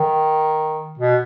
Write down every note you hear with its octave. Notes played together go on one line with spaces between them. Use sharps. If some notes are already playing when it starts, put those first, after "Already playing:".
Already playing: D#3
B2